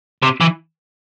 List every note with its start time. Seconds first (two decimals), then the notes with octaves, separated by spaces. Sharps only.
0.22 C3
0.41 E3